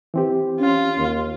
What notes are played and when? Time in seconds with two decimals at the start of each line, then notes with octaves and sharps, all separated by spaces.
0.14 E3 C4 G4
0.60 C#4 F4
0.97 D#2